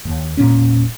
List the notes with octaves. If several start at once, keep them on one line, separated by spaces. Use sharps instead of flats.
D#2
E1 A#2 C#4